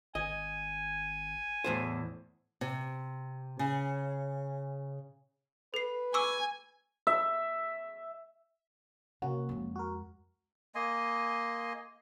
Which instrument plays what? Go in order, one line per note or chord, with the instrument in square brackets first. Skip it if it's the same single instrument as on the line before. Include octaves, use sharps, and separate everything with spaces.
[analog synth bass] G#1 [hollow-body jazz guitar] D#5 [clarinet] G#5
[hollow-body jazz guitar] E2 A2 C5
[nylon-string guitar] C3
C#3
[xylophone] A4 C7 [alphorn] B4
[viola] G#5 [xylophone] C#6 D6 E6
[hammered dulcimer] E5
[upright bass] C3 [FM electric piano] A#3 C#4 F#4
[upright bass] F2 G#3
[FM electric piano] F#4 A#4
[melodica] A#3 D#5 G#5 C6